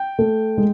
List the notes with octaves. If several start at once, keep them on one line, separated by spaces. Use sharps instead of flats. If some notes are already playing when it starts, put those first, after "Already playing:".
Already playing: G5
A3
G#3